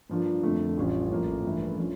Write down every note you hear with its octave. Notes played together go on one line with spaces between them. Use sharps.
G2 F3 A#3 D4 F4
F2 D3 A3
A1 A2 G3 C#4 F4
A#1 A2 F3 A#3
G2 E3 A3 E4
F3 C#4 F4